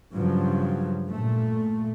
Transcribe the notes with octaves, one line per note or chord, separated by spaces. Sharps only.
G2 C#3 F3 F#3
A#2 A3